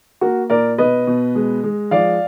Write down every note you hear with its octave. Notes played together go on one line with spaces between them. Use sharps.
A#3 F#4 A#4
A#2 A#4 D5
B2 B4 D#5
B2
G#3
G#3
F3 D5 F5